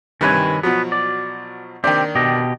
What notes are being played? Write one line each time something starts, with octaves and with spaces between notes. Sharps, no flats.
G2 C3 D#3 B4 C#5 G#5
B2 F3 F#3 B3
D5
D#3 A#3 C4 D4 G4
B2 G4 D#5